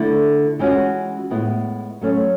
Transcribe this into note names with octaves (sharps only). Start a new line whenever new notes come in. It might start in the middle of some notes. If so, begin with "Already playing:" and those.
Already playing: D3 A3 E4
E3 G#3 C#4 F#4
A2 G#3 B3 E4
F#3 A3 C#4